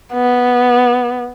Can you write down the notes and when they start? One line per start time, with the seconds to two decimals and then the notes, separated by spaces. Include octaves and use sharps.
0.13 B3